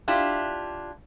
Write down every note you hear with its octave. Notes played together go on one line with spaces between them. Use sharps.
D4 E4 F4 G4